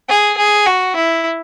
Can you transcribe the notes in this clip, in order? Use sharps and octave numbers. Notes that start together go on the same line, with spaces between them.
G#4
G#4
F#4
E4